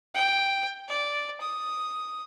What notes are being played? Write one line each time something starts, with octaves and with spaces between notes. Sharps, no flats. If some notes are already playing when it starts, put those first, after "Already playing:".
G5
D5
D#6